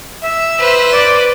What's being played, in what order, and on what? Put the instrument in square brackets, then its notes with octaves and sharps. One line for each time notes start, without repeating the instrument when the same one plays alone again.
[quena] E5
[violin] B4 C5
[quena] D5